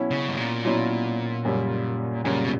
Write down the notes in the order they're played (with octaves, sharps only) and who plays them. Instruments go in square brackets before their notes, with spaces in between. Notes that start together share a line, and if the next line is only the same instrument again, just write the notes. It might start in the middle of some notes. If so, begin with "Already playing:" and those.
Already playing: [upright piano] B2 F#3 C#4 E4
[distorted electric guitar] C#3
G2
A#2
[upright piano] B2 F#3 C#4 E4
F#2 C#3 G3
[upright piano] F#2 C#3 G3 [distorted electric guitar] A#2
[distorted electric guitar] B2